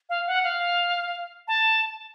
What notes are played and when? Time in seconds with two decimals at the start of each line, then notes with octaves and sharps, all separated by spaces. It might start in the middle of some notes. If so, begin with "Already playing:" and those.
0.09 F5
0.27 F#5
0.44 F5
1.48 A5